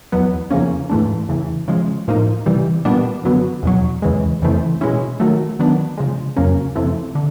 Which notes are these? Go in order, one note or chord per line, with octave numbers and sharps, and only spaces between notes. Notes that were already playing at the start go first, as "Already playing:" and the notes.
E2 B2 F#3 B3
E2 C#3 F3 A#3 C#4
G#2 E3 A3 D4
E2 C#3 E3
C#3 F3 G#3
A2 F3 A#3 D#4
C3 E3 G3
A#2 G3 B3 D4
F#2 D3 F#3 B3
E2 B2 F#3
E2 C#3 E3 G#3
F2 C#3 E3 A3 C4
B2 G#3 C#4 E4
D#3 F#3 A3
D#3 F#3 B3 D4
C#3 F3 G#3
F2 C#3 F#3 A#3 C#4
F2 C3 E3 A3
D3